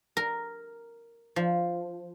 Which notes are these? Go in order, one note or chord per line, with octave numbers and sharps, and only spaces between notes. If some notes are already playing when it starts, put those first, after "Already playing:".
A#4
F3